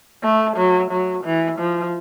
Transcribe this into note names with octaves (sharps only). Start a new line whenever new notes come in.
A3
F#3
F#3
E3
F3